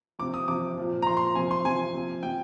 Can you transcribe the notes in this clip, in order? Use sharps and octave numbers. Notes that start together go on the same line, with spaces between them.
C3 F3 D6
D#6
C3 F3 D6
A#2 F3
A#5
A#2 F3 C6
C6
C3 F3 G#5
C6
C3 F3 G#5
C3 F3
C3 F3 G5